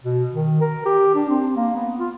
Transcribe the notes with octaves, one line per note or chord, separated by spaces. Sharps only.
B2
D#3
A#4
G4
D4
C4
A#3
B3
F4